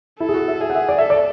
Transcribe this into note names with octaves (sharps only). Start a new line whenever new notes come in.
E4 A4
G#4
F#4
E5
G#4 E5
F#5
E5
D5
A4 E5
D5